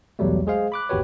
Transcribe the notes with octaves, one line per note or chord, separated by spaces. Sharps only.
B1 E2 F#3 G3 A3
G#3 G#4 C5 F5
B5 D6 F#6
G1 D#2 F#4 G4 B4 C#5